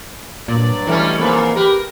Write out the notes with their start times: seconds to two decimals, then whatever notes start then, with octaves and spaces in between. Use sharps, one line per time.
0.48 G2 A#2 F#3 D5
0.87 B2 E3 G3 A3 C#4
1.19 F2 G#2 A#3 B4
1.56 G4 A#4 B4